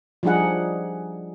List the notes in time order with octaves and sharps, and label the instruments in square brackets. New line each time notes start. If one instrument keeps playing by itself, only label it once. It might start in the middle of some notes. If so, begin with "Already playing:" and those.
[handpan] F3 G3 D4 D#4 G#4 F#5